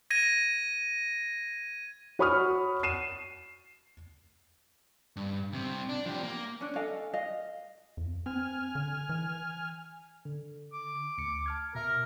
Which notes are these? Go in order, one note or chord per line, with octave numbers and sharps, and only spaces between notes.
G#6 A#6 D#7
F#4 C#5 B5 C#6 D#6 F6
C7 D#7 E7
G2
C2 C3
D4
F3 G4
A#3
C#4 D4
A4 D#5 F5 G#5
D#5 F5
F2
C4 G#5 F6
D3
E3
D3
D6
D2 C#7
A5 F6 G#6
B2 A#4 E5 A#5